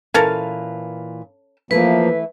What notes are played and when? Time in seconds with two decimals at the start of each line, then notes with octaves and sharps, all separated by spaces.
0.14 A#2 E3 C#4 A4 A#4 F5
1.71 E3 F3 A3 A#3 E4 B4